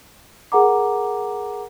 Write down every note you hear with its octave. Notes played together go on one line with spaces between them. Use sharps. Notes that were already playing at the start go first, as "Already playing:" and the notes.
G#4 A#4 F#5 A#5 D6